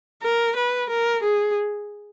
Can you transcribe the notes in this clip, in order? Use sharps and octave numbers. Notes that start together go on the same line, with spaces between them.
A#4
B4
A#4
G#4